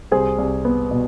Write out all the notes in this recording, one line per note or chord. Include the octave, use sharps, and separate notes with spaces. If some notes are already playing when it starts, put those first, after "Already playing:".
C2 G#4 C5
C2
B3
B2